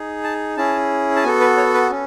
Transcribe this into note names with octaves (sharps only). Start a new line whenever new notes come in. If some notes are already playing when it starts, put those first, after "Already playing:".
Already playing: D#4 G#4
A5
C#4 E4 G#4 A5
A5
B3 F#4 A4 G#5
B4
C#5
B4
C#4